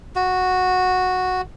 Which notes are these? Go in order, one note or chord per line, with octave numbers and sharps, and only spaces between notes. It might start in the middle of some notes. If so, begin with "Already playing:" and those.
F#4